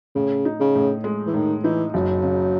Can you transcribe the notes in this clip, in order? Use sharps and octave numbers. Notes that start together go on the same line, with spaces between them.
A2 C#3
D#4
C#3
A2
G#3
E3
A2 D#3
E3 D#4
F#1 F#3
C#3